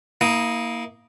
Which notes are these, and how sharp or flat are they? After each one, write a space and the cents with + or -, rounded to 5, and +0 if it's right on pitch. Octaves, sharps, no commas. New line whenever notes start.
A#3 +0 E4 -30 D#6 +0